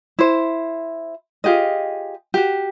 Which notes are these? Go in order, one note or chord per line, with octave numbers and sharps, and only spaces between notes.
E4 C5
F4 G4 G#4 D#5
F#4 G4